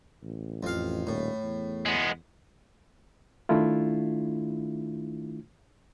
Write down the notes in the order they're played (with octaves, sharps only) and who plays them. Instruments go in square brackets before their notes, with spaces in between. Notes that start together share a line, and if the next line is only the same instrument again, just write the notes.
[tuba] A1
[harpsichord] F2 F5
[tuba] D#1 [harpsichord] A2
[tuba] E2
[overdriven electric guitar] G#3 B3
[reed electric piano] D#3 A3 D4 E4 F4